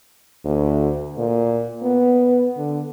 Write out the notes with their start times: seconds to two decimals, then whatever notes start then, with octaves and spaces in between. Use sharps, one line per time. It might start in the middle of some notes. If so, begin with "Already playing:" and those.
0.45 D2
1.18 A#2
1.82 B3
2.57 D3